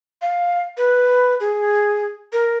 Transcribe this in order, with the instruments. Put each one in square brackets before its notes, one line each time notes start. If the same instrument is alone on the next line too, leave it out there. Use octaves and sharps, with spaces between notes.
[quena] F5
B4
G#4
A#4